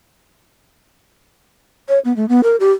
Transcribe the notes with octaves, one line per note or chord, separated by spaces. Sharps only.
C#5
B3
A3
B3
A#4
G4